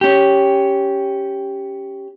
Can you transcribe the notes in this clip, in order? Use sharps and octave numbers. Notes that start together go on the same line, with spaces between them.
C#4 G4